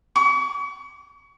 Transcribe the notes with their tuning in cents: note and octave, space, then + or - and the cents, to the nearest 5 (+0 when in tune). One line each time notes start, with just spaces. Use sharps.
C#6 +40